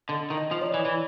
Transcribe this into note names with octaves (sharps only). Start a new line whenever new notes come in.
D3 D#5
D#3
D#5
F3
C#5
D5
E3
E3